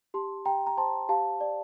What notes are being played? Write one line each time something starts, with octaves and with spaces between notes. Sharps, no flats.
G4 A5 C6
G4 G5 A#5
A#5
C5 A5 C6
G4 F5 A5
D5